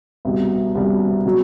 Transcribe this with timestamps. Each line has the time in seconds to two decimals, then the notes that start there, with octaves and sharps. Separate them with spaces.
0.25 C2 B2 G3
0.75 C2 B2 G3
1.26 B2 F#3